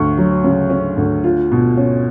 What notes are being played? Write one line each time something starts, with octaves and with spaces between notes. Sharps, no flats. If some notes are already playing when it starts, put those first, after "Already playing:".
Already playing: D2 C#6
F#3
C#3
C#4
D2
F4
B2
C#4